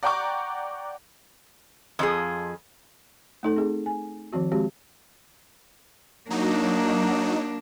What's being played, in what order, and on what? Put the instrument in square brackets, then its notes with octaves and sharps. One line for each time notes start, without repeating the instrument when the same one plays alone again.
[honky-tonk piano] D5 F#5 G5 A#5 C#6 D6
[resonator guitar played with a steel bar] F2 F3 G#4
[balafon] A3 D#4 A4
C4 G#4
G#5
D#3 F3 C4 F#4
G#3 C4 F#4 G4
[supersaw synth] F#3 D#4 [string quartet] A#3 D4